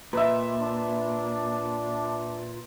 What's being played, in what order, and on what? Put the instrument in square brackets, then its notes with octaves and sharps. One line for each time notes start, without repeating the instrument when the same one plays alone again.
[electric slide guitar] A#2 [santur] B4 E5
[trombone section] D4